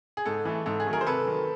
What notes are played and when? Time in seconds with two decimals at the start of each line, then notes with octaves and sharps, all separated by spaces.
0.17 G#4
0.26 G#2 A4
0.45 E3 A3
0.66 G#2 A4
0.80 G#4
0.87 D#3 F#3 A3
0.93 G#4 A#4
1.01 C5
1.07 C3 A4 B4
1.27 D#3 F#3